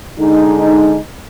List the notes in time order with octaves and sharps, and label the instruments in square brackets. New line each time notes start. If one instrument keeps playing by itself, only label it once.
[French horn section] D3 G#3 D#4